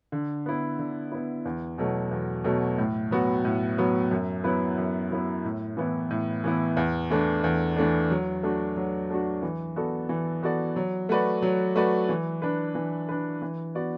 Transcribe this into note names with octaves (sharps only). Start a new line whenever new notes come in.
D3
B3 E4
D3
B3 E4
E2
B2 F#3 A3
E2
B2 F#3 A3
A2
F#3 B3 F#4
A2
F#3 B3 F#4
F#2
F#3 B3 E4 B4
F#2
F#3 B3 E4 B4
A2
E3 B3 E4
A2
E3 B3 E4
E2
E3 A3 D4
E2
E3 A3 D4
F#3
A3 D4 F#4
F#3
A3 D4 F#4
E3
B3 F#4 A4 D5
E3
B3 F#4 A4 D5
F#3
A3 F#4 B4 D5
F#3
A3 F#4 B4 D5
E3
D4 B4
E3
D4 B4
E3
B3 F#4 D5